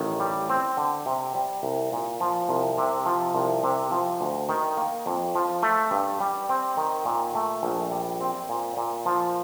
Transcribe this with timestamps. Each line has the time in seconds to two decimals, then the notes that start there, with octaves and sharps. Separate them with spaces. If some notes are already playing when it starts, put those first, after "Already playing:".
Already playing: A1 D#3
0.20 G3
0.50 C4
0.77 D3
1.06 C3
1.35 G3
1.63 C2
1.92 A#2
2.20 F3
2.49 C2
2.78 C3
3.06 F3
3.35 C2
3.64 C3
3.91 F3
4.21 D2
4.49 D#3
4.77 A#3
5.06 F2
5.35 F3
5.63 A3
5.91 G2
6.20 G3
6.49 C4
6.77 D#3
7.05 A#2
7.35 A3
7.63 A#1
7.91 G3
8.21 C4
8.49 A#2
8.77 A#2
9.06 F3